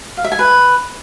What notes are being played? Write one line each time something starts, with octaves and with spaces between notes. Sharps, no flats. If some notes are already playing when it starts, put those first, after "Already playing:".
F5
E5
G#5
B4